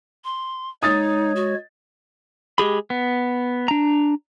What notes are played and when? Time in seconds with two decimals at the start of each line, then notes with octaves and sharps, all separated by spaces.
0.25 C6
0.83 G#3 D#4 C#5 D#6 A6
1.36 F#4
2.58 G#3 G4 G#4 B5
2.90 B3
3.68 D4 A#5